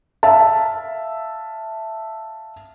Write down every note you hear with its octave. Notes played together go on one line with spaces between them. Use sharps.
E5 F5 A5